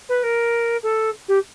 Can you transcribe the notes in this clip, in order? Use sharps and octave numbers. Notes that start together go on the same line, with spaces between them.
B4
A#4
A4
G4